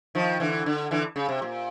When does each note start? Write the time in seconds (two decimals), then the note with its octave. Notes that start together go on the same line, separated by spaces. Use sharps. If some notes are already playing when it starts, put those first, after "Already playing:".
0.15 D#3 F3
0.40 D3 E3
0.66 D3
0.91 D3 E3
1.16 C#3
1.29 C3
1.42 A#2